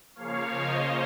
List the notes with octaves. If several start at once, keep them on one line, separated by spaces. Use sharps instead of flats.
C#3 F3 A#3 C#5 F5
C5 D#5